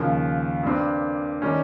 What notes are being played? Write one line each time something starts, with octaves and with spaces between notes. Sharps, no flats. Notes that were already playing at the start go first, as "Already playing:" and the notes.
Already playing: D#2 C#3 F3
G2 G3 C4
D#3 G3 C#4